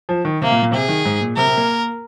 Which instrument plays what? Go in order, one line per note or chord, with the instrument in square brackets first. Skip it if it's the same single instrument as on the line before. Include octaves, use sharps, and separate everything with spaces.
[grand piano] F3
D#3
[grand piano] C3 [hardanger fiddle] A#3
[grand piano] A#2
A#2
[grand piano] C3 [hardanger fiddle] G#4
[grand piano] D#3
G#2
A#2
[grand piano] C3 [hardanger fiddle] A#4
[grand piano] C3
A#3